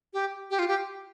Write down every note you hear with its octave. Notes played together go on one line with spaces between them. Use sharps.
G4
G4
F4
G4